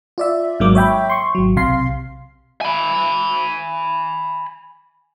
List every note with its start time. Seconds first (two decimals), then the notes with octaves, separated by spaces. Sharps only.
0.18 F4 D5 E5
0.59 G#1 G#2 F#3 A#3 D6
0.75 C#5 E5 G5 B5
1.10 C6 C#6
1.35 G#1 F#3
1.56 B1 C3 F5 C6 C7
2.61 G#5 B5